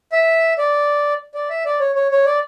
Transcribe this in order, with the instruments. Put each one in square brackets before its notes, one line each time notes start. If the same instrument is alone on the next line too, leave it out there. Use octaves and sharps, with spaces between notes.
[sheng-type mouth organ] E5
D5
D5
E5
D5
C#5
C#5
C#5
D5